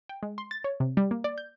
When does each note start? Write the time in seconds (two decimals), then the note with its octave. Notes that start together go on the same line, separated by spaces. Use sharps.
0.09 G5
0.23 G#3
0.38 C6
0.51 A6
0.64 C#5
0.80 C3
0.97 G3
1.11 A#3
1.24 D5
1.38 G6